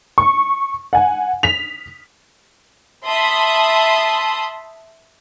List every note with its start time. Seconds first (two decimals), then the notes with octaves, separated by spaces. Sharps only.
0.18 C#6
0.93 F#5 G#5
1.43 B6 F7
3.06 E5 A5 B5 C6 D#6